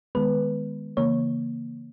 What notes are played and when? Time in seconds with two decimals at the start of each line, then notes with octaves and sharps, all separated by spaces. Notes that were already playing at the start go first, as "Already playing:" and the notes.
0.15 D#3 G#3 B3 B4
0.97 C#3 E3 A#3 C#5